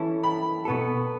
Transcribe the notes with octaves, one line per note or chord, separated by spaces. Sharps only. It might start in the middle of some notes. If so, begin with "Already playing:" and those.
Already playing: E3 C#4 E4 A4 A5
B5
B2 B3 A4